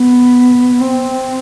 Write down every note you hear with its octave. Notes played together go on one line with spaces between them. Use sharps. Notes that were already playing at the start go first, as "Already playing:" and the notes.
Already playing: B3
C4